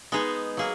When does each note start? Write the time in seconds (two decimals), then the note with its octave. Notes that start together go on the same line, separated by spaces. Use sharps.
0.12 G#3 B3 D#4 G#4
0.57 F#3 A#3 G#4